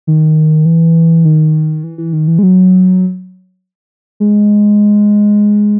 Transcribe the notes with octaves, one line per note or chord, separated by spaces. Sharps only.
D#3
E3
D#3
E3
E3
D#3
E3
G#3
F#3
G#3